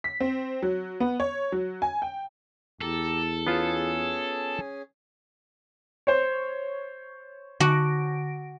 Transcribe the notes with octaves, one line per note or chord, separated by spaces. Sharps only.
B6
C4
F#3
B3
C#5
F#3
G#5
G5
E2 G4 A4 A#5
B3 C#4 F4 G#4 G#5
C5 C#5
D3 F#4 A#6 D7